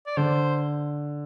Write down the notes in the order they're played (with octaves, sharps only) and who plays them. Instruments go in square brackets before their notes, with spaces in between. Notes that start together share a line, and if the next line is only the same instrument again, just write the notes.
[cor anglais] D5
[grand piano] D3 [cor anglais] C5